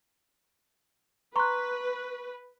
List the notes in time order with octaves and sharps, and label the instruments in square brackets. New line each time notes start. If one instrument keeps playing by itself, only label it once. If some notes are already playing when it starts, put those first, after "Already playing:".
[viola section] B4 [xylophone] A#5 C6 [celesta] C#6 F#6